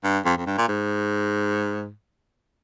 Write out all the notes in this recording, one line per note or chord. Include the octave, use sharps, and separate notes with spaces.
G2
F2
F2
G2
A#2
G#2